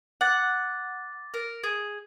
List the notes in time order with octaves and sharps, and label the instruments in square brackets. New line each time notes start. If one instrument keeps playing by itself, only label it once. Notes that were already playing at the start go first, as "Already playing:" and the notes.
[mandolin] F#5 [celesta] D6 A6
[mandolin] A#4
G#4